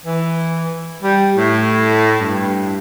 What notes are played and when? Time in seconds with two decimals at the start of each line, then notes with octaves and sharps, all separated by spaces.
0.06 E3
1.02 G3
1.36 A2
2.20 G2